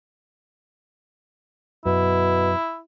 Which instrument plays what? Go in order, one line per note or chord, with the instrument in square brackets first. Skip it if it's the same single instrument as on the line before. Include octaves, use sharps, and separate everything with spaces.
[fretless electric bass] F#2 [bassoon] B2 [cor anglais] E4